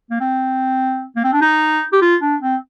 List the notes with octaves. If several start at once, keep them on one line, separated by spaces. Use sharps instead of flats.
A#3
C4
A#3
C4
D4
D#4
G4
F4
D4
C4